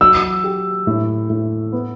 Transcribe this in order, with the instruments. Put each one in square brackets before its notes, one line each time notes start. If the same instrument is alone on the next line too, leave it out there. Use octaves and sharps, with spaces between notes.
[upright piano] F#3 [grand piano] E6
[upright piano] G4
A2
A2
B3